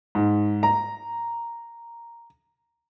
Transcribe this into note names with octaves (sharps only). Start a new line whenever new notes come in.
G#2
A#5